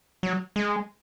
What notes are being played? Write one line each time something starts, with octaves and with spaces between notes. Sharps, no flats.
F#3
G#3